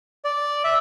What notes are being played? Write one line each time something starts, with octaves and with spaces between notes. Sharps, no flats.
D5
E5